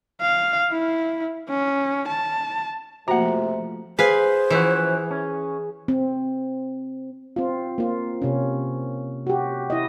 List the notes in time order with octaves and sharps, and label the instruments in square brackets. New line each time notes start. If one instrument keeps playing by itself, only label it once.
[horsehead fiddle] F5
E4
C#4
A5
[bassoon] C3 [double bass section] F3 A3 [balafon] A#3 F#4 [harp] F#5 A#5
[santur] G#4 [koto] B4 F5 G#5 [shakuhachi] C5
[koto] E3 E4 [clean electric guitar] F3 C#4 F#4
[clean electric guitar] C#4
[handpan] C4
C4 F4
A#3 F4
C3 C#4
F#4 G4
E4 D#5